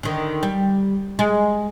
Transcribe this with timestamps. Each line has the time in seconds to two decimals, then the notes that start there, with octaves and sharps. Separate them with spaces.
0.03 D3 D#3
0.43 G3
1.19 G#3